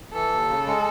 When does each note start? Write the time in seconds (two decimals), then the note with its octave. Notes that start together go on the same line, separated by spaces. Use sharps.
0.14 E3 A4
0.32 D#2
0.49 C#3
0.67 G#3